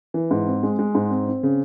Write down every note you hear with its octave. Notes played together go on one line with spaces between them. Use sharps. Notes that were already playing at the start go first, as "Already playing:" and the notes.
E3
G#2
C4
G#3
G#3
G#2
C4
C4
C#3